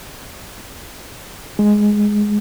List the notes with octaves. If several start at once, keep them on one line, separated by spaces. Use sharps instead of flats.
G#3